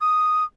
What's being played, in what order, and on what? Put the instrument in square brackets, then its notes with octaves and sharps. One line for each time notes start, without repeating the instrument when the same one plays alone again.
[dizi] D#6